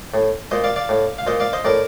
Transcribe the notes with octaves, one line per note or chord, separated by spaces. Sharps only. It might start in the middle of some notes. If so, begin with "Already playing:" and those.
A2
A#2 C5 D#5
D5 F5
D5 F5
A2
F5
A#2 C5 D#5
D5 F5
C5 D#5
A2 A#4 D5